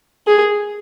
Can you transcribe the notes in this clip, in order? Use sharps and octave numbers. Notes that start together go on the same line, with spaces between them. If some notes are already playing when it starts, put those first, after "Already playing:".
G#4